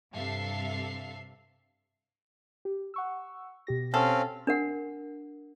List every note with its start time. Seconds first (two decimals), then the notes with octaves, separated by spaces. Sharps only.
0.13 G2 C3 A4 E5 F5 C7
2.65 G4
2.94 F#5 C#6 E6
3.67 B2 G4 A#6
3.94 C4 C#4 A4 F5
4.47 D4 A#4 F#5